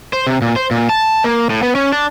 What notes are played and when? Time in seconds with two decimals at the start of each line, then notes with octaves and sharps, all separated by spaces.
0.13 C5
0.27 C3
0.42 A#2
0.56 C5
0.71 A#2
0.89 A5
1.24 A#3
1.50 A2
1.63 B3
1.75 C#4
1.92 D4